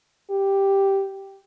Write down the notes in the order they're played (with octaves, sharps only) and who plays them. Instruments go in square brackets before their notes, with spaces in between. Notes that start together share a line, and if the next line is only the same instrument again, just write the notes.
[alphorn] G4